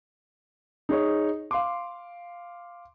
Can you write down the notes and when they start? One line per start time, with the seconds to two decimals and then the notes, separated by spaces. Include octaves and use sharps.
0.89 D#4 G#4 C#5
1.51 F5 C6 D6